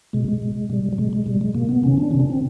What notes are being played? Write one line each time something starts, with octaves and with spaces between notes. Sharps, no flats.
B2 G#3
G#3
B2
B2 G3
G3
B2 G#3
G#3
B2 G3
G#3
B2 A#3
B3
C3 D#3 C#4
D4
C3 D#3 C#4
D4
C4